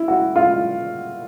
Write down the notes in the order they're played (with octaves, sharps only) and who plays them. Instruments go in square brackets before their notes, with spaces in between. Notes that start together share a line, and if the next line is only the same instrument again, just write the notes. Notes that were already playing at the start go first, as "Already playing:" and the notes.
Already playing: [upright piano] E4
F#4
F4